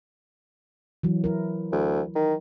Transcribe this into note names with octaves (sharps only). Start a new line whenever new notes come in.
E3 F#3
E4 A#4
D2
D#3